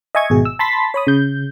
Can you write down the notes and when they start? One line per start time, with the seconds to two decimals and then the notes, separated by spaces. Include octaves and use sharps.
0.15 D#5 E5 G#5 C#6 G#6
0.30 G#1 B2 G#4
0.45 E6
0.59 A5 B5 C6 A6 B6
0.94 C#5 B5 D#6
1.07 C#3 G6